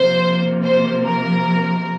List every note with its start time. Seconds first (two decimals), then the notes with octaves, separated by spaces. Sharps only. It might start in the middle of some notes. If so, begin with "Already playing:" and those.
Already playing: C3 F3 A#3 C5
0.63 C5
1.03 A#4